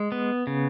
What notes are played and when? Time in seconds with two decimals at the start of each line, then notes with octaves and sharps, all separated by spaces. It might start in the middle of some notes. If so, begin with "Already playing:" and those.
Already playing: G#3
0.12 B3
0.47 C#3